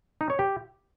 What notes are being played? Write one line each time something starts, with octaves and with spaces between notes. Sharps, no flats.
D#4
C#5
G4